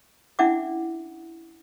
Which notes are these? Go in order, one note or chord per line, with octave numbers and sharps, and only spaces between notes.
C#4 D4 E4 E5 F#5 D6